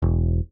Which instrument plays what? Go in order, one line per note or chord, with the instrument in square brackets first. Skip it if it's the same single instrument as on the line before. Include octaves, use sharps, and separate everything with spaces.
[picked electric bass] E1